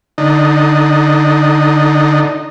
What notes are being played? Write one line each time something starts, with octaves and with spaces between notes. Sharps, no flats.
D3 D#4